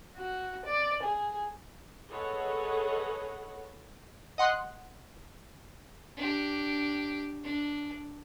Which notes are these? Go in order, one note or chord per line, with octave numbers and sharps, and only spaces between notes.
F#4
D5
G#4
G#4 A4 B4 C#5 D#5 F#5
D#5 F#5 C6 D#6 F#6
D4 G4
D4